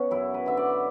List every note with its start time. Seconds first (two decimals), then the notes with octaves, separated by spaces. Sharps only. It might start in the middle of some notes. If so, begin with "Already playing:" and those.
Already playing: C#3 B3 C#4 F#4
0.11 F#2 E4
0.34 B4
0.46 D3 E5
0.57 D5